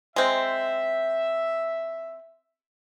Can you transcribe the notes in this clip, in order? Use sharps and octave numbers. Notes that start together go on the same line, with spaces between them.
G#3 C4 E5